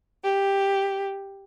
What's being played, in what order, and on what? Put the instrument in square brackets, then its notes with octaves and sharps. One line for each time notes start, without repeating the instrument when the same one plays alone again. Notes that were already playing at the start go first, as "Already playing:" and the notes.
[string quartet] G4